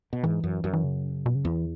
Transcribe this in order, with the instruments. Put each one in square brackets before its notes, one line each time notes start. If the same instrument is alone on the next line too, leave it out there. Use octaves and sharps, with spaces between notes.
[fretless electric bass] B2
[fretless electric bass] G#2 [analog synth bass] E3
[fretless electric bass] F#2
F#2
[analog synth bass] E3
C#3
B2
C#3
[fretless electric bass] E2 [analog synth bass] E3